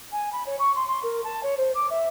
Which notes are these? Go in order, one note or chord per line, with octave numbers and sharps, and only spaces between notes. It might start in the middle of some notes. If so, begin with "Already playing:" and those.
G#5
B5
C#5
C#6
C6
C6
A#4
A5
C#5
C5
D6
E5